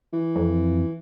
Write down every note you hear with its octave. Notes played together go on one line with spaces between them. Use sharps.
E3
F2